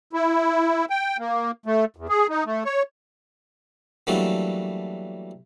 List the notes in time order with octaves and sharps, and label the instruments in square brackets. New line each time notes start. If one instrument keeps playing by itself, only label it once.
[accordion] E4
G5
A#3
A3
E2
G#4
D#4
A3
C#5
[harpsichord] E3 F#3 G3 A3 A#3 D4